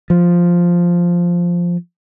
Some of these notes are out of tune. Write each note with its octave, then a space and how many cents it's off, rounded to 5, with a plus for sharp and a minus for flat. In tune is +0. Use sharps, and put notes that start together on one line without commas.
F3 +0